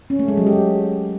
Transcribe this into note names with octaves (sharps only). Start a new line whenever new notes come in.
C#4
A3
G#3
F#3
G4